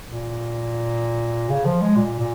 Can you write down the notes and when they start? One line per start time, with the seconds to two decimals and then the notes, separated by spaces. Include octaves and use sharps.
0.10 A#2
1.50 C#3
1.65 F3
1.81 G#3
1.96 A#2
2.19 A#2